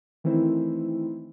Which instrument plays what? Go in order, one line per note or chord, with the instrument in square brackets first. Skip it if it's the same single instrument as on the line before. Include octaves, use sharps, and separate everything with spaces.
[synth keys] D#3 E3 A3 C4 E4 C5